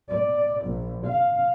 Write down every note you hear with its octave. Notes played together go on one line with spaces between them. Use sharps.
D5
A#1
F5